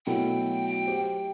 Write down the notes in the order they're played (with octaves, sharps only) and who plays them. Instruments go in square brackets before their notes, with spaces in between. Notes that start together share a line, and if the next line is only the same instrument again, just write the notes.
[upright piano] B2 F#3 A3 E4 A4 [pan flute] G5
[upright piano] G4 C5